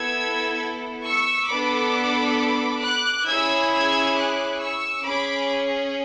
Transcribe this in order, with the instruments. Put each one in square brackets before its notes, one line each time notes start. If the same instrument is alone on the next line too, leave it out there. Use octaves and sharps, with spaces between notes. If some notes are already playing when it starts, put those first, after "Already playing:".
Already playing: [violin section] B3 E4 A4 E6 G#6
C#6 E6
B3 D4 A4 B5 D6
D6 F#6
C#4 E4 G#4 E6 G#6
E6 G#6
D6 F#6
C#6 E6
C#4 G#4 B5 D6